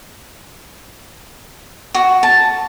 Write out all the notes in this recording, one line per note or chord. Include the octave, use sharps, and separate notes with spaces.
F#4
A5